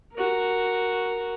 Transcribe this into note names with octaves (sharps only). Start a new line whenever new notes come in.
F#4 A#4